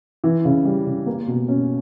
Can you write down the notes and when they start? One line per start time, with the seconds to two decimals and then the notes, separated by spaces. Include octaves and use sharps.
0.24 E3
0.45 C#3
0.65 G3
0.86 C#3
1.06 A#3
1.27 B2
1.48 C#4